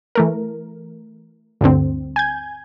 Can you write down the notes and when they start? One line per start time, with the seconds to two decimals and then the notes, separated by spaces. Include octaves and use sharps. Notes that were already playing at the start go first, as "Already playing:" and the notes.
0.15 E3 A3 A#4
1.61 D2 G2 D3 C4
2.16 G#5 G6 G#6